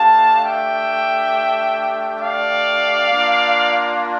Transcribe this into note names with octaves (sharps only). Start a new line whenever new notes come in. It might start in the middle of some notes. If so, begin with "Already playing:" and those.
Already playing: A3 D4 G4 F5 A5
E5 G5
D5 F5
A#3 D4 F4